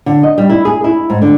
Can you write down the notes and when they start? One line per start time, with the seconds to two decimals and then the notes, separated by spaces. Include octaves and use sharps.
0.06 D3
0.23 D#5
0.38 G3
0.49 E4
0.65 G#4
0.84 E4
1.10 G#2
1.22 D3